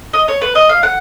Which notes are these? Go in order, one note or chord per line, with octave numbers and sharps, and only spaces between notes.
D#5
C#5
B4
D#5
F5
F#5